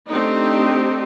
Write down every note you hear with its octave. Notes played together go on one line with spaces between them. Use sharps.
A3 C4 D4 D#4 G4